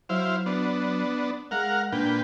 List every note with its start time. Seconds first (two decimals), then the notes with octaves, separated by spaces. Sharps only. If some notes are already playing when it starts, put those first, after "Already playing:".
0.09 F#3 E4 C5 F5
0.46 B3 D4
1.51 G#3 A#4 F5 F#5
1.92 A#2 D4 B4 G5